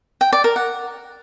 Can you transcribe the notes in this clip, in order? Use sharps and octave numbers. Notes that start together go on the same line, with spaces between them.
G5
D5
A#4
F#5